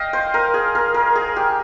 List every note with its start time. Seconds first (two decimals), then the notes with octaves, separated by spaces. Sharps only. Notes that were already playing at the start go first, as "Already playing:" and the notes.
Already playing: D#5 F5 G5
0.13 C5
0.34 A#4
0.54 G#4
0.75 A#4
0.94 A#4
1.15 G#4
1.36 G4